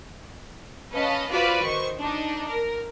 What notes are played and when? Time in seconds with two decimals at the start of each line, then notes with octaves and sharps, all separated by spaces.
0.92 C#4 B4 D#5 F5 A5
1.31 F4 F#4 B4 C5 D5 F5
1.62 D#3 C5 C#6
1.98 D4 D#4
2.49 A#4